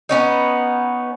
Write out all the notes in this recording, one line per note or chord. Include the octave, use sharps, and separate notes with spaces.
B3 C#4 D#4